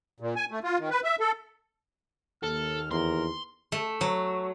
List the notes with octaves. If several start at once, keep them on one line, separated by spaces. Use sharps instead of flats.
A#2
G#5
A3
F4
D#3
B4
E5
A4
D#2 A4 F6
E2 A#4 C6
A3
F#3